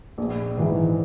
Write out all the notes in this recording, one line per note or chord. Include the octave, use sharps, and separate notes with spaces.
A#1
G#2 E3